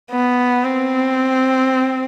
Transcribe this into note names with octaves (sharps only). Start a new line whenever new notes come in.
B3
C4